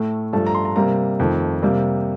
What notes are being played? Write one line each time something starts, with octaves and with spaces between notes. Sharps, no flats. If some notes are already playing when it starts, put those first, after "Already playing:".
Already playing: A2 A3
G2 F3 A3 A5
A#5
C6
A#5
C3 G3 A#3 A#5
F2 D#3 A3
C3 G3 A#3